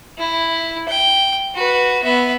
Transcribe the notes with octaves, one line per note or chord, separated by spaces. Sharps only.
E4
G5
F#4 B4
B3 E5